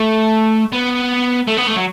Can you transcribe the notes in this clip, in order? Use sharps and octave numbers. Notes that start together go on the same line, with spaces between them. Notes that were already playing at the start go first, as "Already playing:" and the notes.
Already playing: A3
B3
A3
B3
A3
F#3